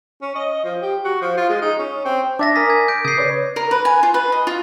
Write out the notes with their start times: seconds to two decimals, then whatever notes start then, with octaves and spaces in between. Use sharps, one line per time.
0.22 C#4
0.35 D#5
0.64 F3
0.82 G4
1.04 F#4
1.21 F3
1.37 F4
1.49 G#3
1.61 D#4
1.78 C#4
2.05 C4
2.39 D4 E5 D6 A6 A#6
2.56 A#4 G#5 D#6 B6
2.70 G#6
2.88 G6 D7
3.05 C#3 D#6 G#6 C7
3.18 B4 C#5 D5
3.56 A#4
3.71 B4
3.85 G#5
4.03 F4
4.14 B4
4.32 D#5
4.47 F4